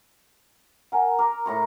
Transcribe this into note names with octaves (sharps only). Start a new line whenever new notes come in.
A#4 F#5 G#5
A#4 D6
A2 A#5 C#6